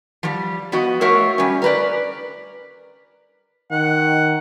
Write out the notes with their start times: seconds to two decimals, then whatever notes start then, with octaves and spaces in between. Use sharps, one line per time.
0.23 F3 G3
0.72 F3 B3 F#4 D#5
1.01 A3 F#4 A#4 C#5 E5 F5
1.38 G3 C#4
1.62 A#4 B4 D5
3.71 D#3 F#5